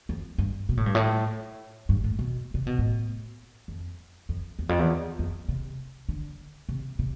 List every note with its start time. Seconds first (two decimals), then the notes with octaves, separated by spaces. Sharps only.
0.09 F2
0.38 G2
0.69 B2
0.77 A2
0.86 G2
0.95 A2
1.89 G2
2.04 A2
2.19 B2
2.54 C3
2.67 B2
2.79 A2
3.68 F2
4.29 F2
4.59 E2
4.69 F2
4.79 E2
5.19 F2
5.49 C3
6.09 D3
6.69 C3
6.99 C3